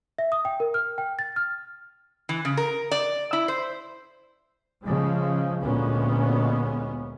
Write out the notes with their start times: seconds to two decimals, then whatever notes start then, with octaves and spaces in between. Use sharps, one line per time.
0.19 E5
0.32 D#6
0.45 G5
0.60 A#4
0.74 F6
0.98 G5
1.19 A6
1.36 F6
2.29 E3
2.45 C#3
2.57 A#4
2.91 D5
3.33 E4
3.48 C5
4.84 C#3 F3 G#3
5.62 D2 A#2 G#3 B3 C#4